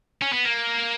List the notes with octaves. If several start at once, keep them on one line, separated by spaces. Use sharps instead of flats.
C#4
B3
A#3